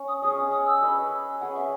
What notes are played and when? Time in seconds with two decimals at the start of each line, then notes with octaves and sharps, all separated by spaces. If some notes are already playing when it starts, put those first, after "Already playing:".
Already playing: C#4
0.08 D#6
0.22 C#4 G#4 D#5 D#6
0.51 D#6
0.66 E6
0.81 C#4 G#4 B4 D#5
1.40 C#4 G#4 B4 D#5 F#5
1.55 E5